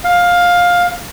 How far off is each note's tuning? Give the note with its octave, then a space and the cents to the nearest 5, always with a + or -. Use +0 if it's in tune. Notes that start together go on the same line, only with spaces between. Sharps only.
F5 +15